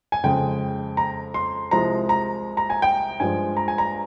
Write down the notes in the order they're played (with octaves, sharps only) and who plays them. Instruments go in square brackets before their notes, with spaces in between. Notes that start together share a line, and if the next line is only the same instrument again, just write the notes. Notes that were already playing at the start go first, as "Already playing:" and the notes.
[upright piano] G#5
F2 C#3 G#3 G5
A#5
C6
C2 C3 F3 G#3 A#5
A#5
A#5
G#5
G5
G2 F3 G#3 G#5
A#5
G#5
A#5